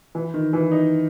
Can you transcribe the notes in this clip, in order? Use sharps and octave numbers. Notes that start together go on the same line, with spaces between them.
E3
D#3
E3
D#4